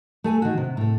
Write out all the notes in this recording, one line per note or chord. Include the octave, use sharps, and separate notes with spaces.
A3 A4 G#5
D#3 F#4
C3
A2 A4